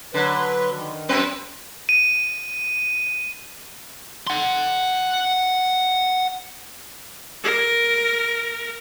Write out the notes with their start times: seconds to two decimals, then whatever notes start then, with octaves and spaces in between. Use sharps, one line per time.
0.14 D3 F#3 B4
0.74 D#3
1.09 F#2 C4 B4
1.89 D#7
4.27 F#5 C6
7.44 A#4